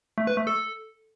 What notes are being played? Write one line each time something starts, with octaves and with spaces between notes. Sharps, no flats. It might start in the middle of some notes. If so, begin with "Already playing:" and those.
A3
B4
A3
A4